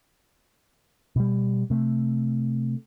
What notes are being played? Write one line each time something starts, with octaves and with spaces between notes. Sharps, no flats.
B2 G3
C3 A3